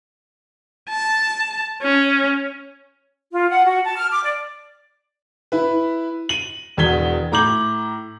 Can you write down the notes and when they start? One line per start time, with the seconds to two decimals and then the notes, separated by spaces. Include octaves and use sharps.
0.89 A5
1.82 C#4
3.32 F4
3.50 F#5
3.65 F#4
3.84 A5
3.97 F6
4.11 D6
4.24 D5
5.52 E4 B4
6.29 D#7 F#7
6.77 E1 E2 F#4 G#6 B6 G7
7.32 A2 A#5 D6 G6 F#7